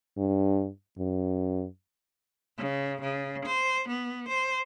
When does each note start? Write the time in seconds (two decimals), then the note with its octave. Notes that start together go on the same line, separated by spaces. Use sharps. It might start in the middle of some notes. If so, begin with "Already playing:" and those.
0.17 G2
0.99 F#2
2.58 C#3
3.02 C#3
3.46 C5
3.89 B3
4.29 C5